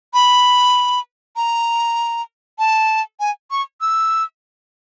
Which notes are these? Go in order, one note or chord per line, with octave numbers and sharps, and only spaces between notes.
B5
A#5
A5
G#5
C#6
E6